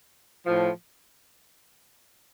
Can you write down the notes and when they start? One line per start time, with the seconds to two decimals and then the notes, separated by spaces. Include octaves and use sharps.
0.45 A2 F3